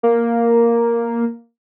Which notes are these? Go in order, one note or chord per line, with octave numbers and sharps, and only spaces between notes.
A#3